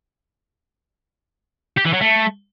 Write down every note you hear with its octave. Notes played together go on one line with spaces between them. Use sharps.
G4
E3
F#3
A3